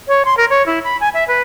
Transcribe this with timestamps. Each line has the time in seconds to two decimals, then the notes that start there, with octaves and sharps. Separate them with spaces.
0.08 C#5
0.25 C6
0.37 A#4
0.50 C#5
0.66 E4
0.84 B5
1.00 G#5
1.14 E5
1.28 B4